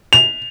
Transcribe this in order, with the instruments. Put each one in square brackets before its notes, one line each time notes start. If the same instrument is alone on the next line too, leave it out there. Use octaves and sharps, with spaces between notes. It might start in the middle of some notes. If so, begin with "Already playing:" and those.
[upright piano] F7